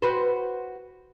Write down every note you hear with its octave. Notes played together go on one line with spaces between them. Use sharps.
F#4 B4 C5